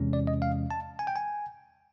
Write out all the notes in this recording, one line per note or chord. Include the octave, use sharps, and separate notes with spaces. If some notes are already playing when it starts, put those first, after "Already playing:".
Already playing: E2 C3 E3 G#3 C#4
D5
D#5
F5
A5
G#5
G5
G#5